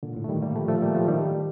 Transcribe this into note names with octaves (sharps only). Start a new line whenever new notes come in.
A#2 D3
A2
A3
D#3 G3
G3 A#3
F3 A3
F3 A3
G3 A#3
F3 A3
D#3 G3